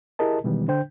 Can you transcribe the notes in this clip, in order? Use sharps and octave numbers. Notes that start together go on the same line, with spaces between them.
E4 G4 G#4 A#4 D#5 A5
B2 D#3 E3 G3 G#3 B3
D3 D4 C5 G5 G6